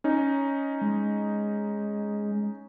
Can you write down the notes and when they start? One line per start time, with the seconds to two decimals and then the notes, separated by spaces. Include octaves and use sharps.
0.04 C#4 D#4
0.81 G#3